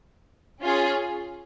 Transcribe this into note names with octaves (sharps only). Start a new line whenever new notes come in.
C#4 F4 G#4